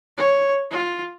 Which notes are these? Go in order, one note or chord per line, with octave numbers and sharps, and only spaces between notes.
C#5
F4